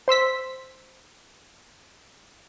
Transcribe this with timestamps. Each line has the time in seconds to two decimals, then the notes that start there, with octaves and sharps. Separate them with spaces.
0.08 C5 C6 E6 B6